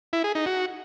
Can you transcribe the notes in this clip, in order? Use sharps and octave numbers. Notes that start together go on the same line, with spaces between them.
E4
G#4
D#4
F#4